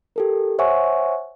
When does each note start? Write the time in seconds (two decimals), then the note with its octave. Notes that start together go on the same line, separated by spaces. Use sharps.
0.16 G4 A4 A#4
0.59 C5 C#5 E5 F#5 G#5 C#6